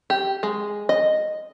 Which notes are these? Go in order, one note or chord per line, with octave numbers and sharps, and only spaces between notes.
G4
G#3
D#5